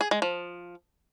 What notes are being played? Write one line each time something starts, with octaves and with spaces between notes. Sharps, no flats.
G#4
G#3
F3